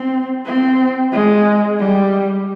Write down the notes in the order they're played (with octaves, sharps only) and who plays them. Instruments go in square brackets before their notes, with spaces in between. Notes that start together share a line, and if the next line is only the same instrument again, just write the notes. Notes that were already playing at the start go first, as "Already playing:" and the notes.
Already playing: [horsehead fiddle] C4
C4
G#3
G3